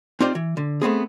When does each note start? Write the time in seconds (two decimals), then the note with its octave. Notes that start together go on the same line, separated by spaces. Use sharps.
0.20 C4 D#4 F4 G4 C5 D5
0.35 E3
0.57 D3
0.82 A3 B3 C4 G#4